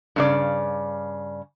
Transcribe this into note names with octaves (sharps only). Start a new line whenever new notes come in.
G2 C#3 D5